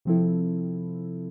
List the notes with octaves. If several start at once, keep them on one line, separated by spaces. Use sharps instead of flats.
C3 F3 C4 E4 A4